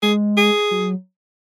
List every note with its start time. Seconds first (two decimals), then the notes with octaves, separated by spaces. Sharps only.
0.03 G#3 G#4
0.37 G#4
0.71 F#3